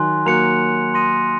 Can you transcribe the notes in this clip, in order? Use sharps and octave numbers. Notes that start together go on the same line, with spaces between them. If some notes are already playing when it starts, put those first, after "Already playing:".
Already playing: D#3 F#3 G#5 C6 F#6
F#3 A#3 F#6 C#7 F7
C6 D#6 A#6 D#7